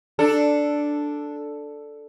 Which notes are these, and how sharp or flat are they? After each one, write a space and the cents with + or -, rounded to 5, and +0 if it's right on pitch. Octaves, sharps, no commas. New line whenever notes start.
D4 +0 A4 +0